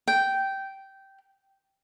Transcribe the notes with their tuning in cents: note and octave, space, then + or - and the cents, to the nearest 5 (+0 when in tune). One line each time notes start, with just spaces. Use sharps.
G5 -10